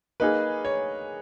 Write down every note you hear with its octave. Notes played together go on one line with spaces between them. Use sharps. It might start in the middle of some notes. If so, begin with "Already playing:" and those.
A#3 D#4 G#4 B4
C#5